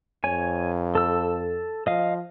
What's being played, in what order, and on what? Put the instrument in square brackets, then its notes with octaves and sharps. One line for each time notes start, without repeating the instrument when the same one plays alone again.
[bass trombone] F2 [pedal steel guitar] C#5 G#5
[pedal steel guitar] A4 E6
[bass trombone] F3 [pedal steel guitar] D#5 F5